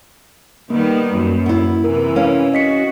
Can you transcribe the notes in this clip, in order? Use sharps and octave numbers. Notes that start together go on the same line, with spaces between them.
D#3 G3 A#3 B3
F#2 A#3
B3 E4
C3 E3 A#4
C#4 F5
F#4 D#5 B6 C#7